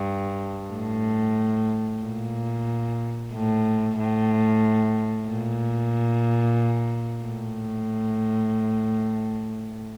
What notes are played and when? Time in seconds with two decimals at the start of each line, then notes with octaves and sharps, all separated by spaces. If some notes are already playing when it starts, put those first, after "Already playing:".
Already playing: G2
0.72 A2
2.02 A#2
3.33 A2
3.98 A2
5.29 A#2
7.25 A2